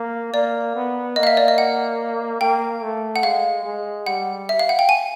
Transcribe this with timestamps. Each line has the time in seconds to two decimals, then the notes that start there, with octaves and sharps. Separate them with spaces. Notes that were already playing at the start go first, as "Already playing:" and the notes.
Already playing: A#3
0.34 A#3 D5
0.76 B3
1.16 A#3 D#5
1.23 F5
1.27 E5
1.37 D5
1.48 D#5
1.58 F#5
2.41 A#3 G5
2.83 A3
3.16 F#5
3.23 G#3 F5
3.65 G#3
4.06 G3 F#5
4.49 E5
4.59 F5
4.69 F#5
4.79 G5
4.89 G#5